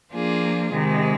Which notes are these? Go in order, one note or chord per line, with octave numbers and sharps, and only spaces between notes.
F3 A#3 D4 F4 G#4
C3 D#3 G#3